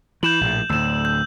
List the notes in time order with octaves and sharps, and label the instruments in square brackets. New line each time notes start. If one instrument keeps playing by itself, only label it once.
[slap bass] E3 [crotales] G6 E7 F#7
[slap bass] A#1 A2
[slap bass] D2 A2 [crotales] E6 E7
[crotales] G6